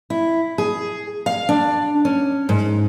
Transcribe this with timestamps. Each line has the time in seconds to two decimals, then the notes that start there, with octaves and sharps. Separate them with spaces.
0.10 E4
0.58 G#4
1.26 F5
1.49 D4
2.05 C#4
2.49 G#2